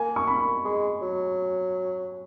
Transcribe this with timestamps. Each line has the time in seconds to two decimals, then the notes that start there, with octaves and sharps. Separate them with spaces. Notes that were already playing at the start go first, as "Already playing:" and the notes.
Already playing: A#3 G#5
0.16 C#6
0.27 B5
0.65 G#3
1.01 F#3